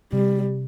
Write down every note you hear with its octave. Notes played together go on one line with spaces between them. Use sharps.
C3 G3